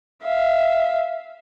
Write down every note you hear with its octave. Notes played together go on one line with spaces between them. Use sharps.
E5 F5